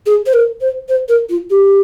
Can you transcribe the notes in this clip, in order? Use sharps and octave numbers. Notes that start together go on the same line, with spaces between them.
G#4
C5
A#4
C5
C5
A#4
F4
G4